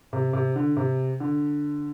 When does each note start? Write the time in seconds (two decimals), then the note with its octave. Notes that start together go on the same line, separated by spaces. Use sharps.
0.13 C3
0.33 C3
0.56 D3
0.77 C3
1.20 D3